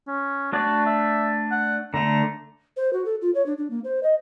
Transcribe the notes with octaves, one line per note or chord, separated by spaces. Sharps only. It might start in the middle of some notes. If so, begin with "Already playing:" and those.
C#4
A3 D4 F#4 D5
E5
F#5
D3 A3 A#5
C5
F#4
A4
F4
C#5
D4
D4
A#3
C5
D#5